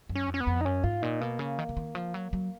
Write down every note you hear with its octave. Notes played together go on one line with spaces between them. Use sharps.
F#2
C#4
F2
C#4
B3
F2
D#4
F#2 C#4
G#2 F4
A#2 D#4
B2 A#3
C#3
D#3
C#3
D#3
F3
F#3
F#3